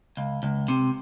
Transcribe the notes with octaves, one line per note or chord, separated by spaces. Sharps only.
C#2
C#2
C3